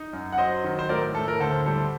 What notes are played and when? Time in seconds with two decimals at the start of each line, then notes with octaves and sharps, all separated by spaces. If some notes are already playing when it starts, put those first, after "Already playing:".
Already playing: D#4
0.13 F#2
0.32 F#5
0.38 F#3 C5 D#5
0.64 D#3
0.79 C5
0.89 A2 A#4 D5
1.14 A2 A4
1.28 A#4
1.40 D2 A4 C5
1.66 G3 A4 C5